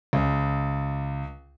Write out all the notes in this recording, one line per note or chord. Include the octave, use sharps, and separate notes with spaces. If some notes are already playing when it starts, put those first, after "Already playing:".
C#2